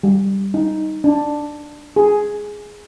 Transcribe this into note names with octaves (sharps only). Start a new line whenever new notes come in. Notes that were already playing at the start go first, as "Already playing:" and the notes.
G3
D#4
D4
G#4